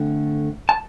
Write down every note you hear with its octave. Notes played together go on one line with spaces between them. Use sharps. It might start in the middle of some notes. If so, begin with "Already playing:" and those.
Already playing: D3 A3 C4
A5